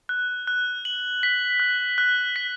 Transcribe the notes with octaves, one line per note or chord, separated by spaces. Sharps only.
F#6
F#6
F#7
B6
F#6
F#6
B6